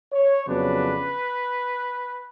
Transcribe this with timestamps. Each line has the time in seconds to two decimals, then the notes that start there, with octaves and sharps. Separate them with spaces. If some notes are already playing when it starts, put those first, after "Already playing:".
0.12 C#5
0.47 F2 C#3 F#3 B3 D4 B4